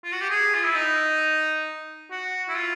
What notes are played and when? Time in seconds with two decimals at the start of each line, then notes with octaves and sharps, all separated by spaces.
0.04 F4
0.12 F#4
0.21 G4
0.30 G#4
0.54 F4
0.64 E4
0.75 D#4
2.11 F#4
2.48 E4
2.57 F4